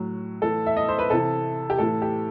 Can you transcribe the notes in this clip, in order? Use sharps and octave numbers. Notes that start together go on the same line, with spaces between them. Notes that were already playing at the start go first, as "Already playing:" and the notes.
Already playing: A2 F#3
A2 E3 A4
E5
D#5
C5
B4
C3 E3 A4
G4
A2 E3 A4
G4